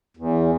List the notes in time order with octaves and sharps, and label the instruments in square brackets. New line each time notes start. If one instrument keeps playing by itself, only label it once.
[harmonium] E2